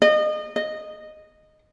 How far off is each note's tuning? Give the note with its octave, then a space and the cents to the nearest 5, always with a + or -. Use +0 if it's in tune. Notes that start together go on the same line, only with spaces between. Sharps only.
D#5 -30
D#5 -10